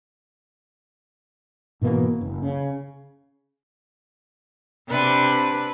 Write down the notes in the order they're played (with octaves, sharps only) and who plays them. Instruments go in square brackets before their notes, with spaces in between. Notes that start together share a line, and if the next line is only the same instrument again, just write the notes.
[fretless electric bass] G#2 B2 E3 A#3
F#1
C#3
[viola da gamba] C3 D4 B4